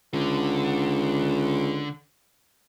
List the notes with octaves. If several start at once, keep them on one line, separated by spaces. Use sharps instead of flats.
C#2 D3